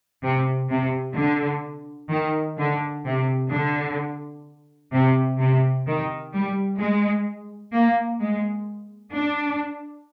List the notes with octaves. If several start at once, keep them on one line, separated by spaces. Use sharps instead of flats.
C3
C3
D3
D#3
D3
C3
D3
C3
C3
D#3
G3
G#3
A#3
G#3
D4